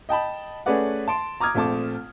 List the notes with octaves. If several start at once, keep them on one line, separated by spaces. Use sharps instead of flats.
D#5 G5 A5 B5
A3 C#4 G#4 B4 D5 F#5
A5 C6 D7
A#5 D6 D#6 F6 G#6
A#1 A3 C4 A5 D6